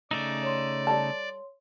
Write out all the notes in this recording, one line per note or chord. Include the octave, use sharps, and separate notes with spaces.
C#3 A3 D#4 D5
C#5 C6
G3 A4 A5